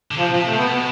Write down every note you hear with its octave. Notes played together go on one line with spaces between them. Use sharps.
D3
C3 F3
F3
C3
A3
C3 B3
B2 B3